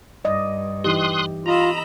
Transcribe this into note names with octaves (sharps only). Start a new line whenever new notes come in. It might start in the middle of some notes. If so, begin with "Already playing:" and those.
G2 D5 D#5
E3 D#4 G4 C6 D#6 F#6
F4 D#5 A#5 B5 E6